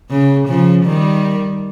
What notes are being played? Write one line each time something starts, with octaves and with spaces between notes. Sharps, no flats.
C#3
C#3 F3
D#3 G3